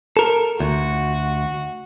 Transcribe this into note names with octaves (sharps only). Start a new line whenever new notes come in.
A4 A#4
D2 F#4